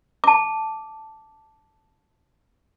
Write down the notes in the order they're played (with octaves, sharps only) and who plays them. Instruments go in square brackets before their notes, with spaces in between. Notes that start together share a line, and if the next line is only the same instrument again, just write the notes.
[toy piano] A5 D6